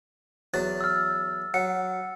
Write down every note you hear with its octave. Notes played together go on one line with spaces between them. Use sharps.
E2 F#3 F#4 A6
E6 F6
F#3 F#5 C#7